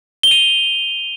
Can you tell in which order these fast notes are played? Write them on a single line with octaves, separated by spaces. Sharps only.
G7 F7 D#7